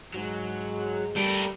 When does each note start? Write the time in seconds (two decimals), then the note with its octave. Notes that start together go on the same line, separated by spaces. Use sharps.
0.14 G#2 F#3
1.16 G3 A3 A#4